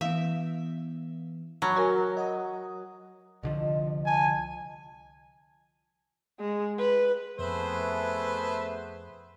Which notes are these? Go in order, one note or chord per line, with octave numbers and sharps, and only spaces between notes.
E3 B3 E5 F5
F#3 A5 B5 F6
F#4 A#4 C#5 G#5
D#5 F#5 D#6
C2 D3 F3 D#5
G#5 A5
G#3
B4
F2 A3 B3 G#4 B4 C5 E5